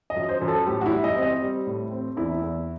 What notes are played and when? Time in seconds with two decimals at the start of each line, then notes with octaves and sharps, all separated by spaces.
0.10 D#5
0.16 F#2
0.29 C5
0.41 F#2
0.48 A4
0.67 A2 G4
0.81 F#4
0.86 E4
0.92 G3
1.04 D#5
1.16 C4
1.22 D#5
1.42 G3
1.67 A2
1.91 C4
2.16 E2 E4
2.42 E2